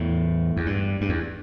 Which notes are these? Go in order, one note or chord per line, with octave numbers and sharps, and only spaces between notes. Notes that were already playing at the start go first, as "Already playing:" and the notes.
Already playing: E2 A2
E2
G2
G2
E2